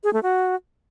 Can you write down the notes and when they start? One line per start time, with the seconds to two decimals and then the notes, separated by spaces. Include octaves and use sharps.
0.04 G#4
0.13 A3
0.23 F#4